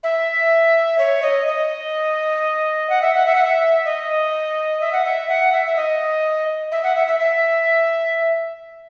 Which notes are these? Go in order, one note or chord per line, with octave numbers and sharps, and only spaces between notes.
E5
C#5
D#5
D#5
F#5
E5
F#5
E5
F#5
E5
D#5
E5
F#5
E5
F#5
E5
E5
D#5
E5
F#5
E5
E5
E5